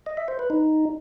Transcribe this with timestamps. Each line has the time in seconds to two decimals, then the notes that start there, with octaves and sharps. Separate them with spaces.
0.06 D#5
0.17 E5
0.28 C5
0.39 B4
0.50 D#4